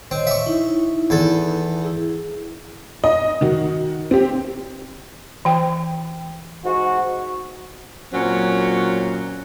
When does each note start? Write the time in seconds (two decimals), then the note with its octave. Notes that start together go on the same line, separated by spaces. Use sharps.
0.11 C4 C#5 D#5
0.27 E5 C#6
0.46 D#4 E4
1.10 E2 A4
1.82 E4 G#4
3.04 D#5
3.41 D#3 F#4
4.11 C4 G4
5.45 E3 G5
6.64 G#2 F#4
8.13 A#2 F#3 C4 C#4